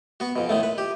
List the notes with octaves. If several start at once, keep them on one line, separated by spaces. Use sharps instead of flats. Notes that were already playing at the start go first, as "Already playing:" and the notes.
B3 F#4
F2 B2
A2 D#3 A3
B4
G4